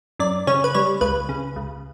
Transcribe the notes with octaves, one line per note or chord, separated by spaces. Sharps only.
F#2 D5
C#3 C#5
B4
G3 C#5
C#2 B4
C#3
C#2